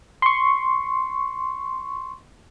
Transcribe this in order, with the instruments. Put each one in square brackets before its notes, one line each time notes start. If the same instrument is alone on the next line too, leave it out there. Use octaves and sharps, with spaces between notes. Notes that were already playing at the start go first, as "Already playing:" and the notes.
[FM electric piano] C6 C#6